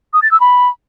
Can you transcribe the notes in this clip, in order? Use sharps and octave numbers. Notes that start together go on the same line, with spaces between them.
D#6
A6
E6
B5